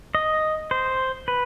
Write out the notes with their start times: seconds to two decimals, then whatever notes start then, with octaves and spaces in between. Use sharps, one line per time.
0.15 D#5
0.71 C5
1.28 B4